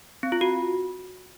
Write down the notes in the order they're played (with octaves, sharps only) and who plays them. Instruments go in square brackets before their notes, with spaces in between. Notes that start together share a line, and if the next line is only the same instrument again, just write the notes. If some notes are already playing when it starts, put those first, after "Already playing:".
[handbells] C4
F4
F#4